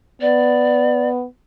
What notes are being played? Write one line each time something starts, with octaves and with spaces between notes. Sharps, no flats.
B3 D5